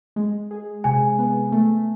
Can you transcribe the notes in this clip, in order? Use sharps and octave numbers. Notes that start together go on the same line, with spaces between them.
G#3
G#4
C3 G#5
B3
A3